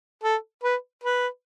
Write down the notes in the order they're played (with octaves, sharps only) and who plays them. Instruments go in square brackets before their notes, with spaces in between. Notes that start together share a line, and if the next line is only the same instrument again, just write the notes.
[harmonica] A4
B4
B4